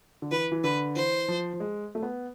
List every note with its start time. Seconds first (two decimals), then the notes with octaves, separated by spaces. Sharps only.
0.22 D3
0.31 E3 B4
0.52 E3
0.64 D3 B4
0.96 E3 C5
1.28 F3
1.54 F3
1.60 G#3
1.95 A3
2.03 B3